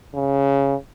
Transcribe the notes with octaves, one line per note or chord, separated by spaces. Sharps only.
C#3